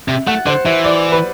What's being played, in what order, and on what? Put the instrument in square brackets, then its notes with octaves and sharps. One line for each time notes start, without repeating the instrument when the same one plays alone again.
[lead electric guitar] C3 [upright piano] E5
[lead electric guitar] A3 [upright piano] F#5
[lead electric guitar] D3 [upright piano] C5
[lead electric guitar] E3 [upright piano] E5
[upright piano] D5
B4